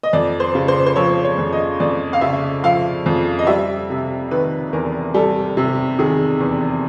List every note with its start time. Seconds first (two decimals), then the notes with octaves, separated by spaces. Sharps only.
0.03 D#5
0.13 F2 D5
0.40 C5
0.55 C#3
0.68 C5
0.86 C5
0.96 F3 C#5
1.25 C#5
1.38 F2
1.53 D#5
1.80 F2 D5
2.13 F5
2.21 C#3 E5
2.64 F3 F5
3.06 F2
3.39 D#5
3.47 G3 E5
3.90 C3
4.31 D#3 B4
4.73 E2 A#4
5.14 G3 A4
5.57 C3
5.99 D#3 G#4
6.40 E2